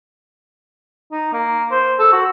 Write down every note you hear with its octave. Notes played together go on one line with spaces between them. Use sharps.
D#4
A#3
C5
A4
F#4